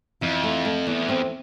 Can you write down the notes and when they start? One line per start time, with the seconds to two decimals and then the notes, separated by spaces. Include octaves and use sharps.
0.21 F2 E3
0.43 A3
0.65 A3
0.87 E2 E3
1.09 C4